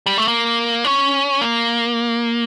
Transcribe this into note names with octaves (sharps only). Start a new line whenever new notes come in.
G3
A3
A#3
C#4
A#3